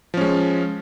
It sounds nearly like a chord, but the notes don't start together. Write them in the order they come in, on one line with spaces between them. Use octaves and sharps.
F3 C#4 G#3